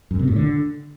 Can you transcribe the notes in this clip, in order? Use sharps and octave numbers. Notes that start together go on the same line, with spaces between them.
F#2
C3
A2
D3